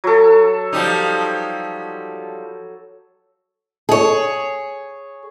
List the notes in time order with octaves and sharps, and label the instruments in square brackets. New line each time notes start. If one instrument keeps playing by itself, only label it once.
[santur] F#3 A4
[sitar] F3 G3 D#4
[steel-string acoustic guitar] G#4 C#5